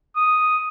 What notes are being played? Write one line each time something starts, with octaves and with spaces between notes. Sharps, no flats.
D#6